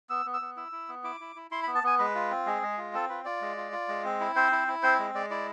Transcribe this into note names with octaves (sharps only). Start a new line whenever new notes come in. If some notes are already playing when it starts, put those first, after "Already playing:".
B3 E6
B3
E6
B3
E4 E6
E4
B3
E4 D6
E4
E4
E4 C6
B5
B3
A5
B3 G#5
G#3 B4
F4
C4
G#3 G#4
G#3
F4
C4 A4
F4 B4
F4 D5
G#3
F4
F4
G#3
C4
E4
C4 C5
E4
E4
C4 C5
G#3
G#3 D5
E4 D5